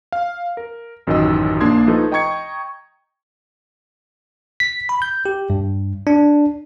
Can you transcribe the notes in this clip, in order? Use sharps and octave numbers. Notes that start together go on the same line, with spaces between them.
F5
A#4
A1 F#2 D#3 D#4 D#5 E6
A#1 A#3 D4 C6 D#6 G#6
F3 A3 D#4 A4 B4
D#5 G5 A#5 C#6 G#6 C#7
B6
B5
G6
G4
G2
D4